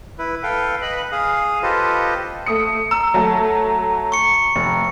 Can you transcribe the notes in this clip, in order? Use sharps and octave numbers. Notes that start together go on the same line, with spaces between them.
E4 B4
A4 B4 F5 G5
B4 D#5 B5 F#6
G#4 F5 D#6
F4 G4 A4 B4 C5 D#5
A3 D#6 C#7
A#5 E6
F#3 A3 A4
C#6 C#7
F1